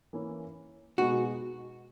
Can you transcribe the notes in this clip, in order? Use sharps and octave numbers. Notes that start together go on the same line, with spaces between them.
E3 A#3 C#4 E4
B2 G#3 B3 D#4 F#4